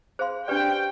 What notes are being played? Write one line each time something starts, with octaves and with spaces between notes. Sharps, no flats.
G#4 C5 F5 C6
D4 G4 B4 D5 G5